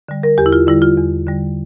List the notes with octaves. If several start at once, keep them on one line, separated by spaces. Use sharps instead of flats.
D3 G3
A#4
E2 G4
E4
F4
D3 G3 E4
F4
E2
D3 G3